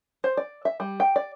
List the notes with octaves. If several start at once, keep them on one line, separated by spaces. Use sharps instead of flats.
C5
D5
E5
G3
G5
D5